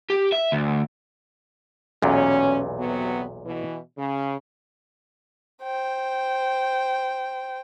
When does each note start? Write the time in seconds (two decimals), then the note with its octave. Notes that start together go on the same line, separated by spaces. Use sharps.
0.10 G4
0.32 E5
0.52 D2
2.02 B1 E2 A#2 C#4
2.79 C3 F#3 B3
3.46 B2 E3
3.98 C#3
5.63 C5 G5